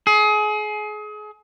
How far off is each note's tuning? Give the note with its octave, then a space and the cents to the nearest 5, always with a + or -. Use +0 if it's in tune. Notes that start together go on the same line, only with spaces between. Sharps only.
G#4 +30